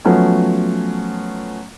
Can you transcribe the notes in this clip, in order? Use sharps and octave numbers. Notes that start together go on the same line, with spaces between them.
F3 F#3 A3 B3 C#4